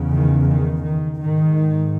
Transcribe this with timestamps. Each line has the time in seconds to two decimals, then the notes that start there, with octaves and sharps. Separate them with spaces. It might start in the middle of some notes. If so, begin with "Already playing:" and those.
Already playing: E2 C#3
0.11 D#3
0.49 D#3
0.84 D#3
1.20 G#2 D#3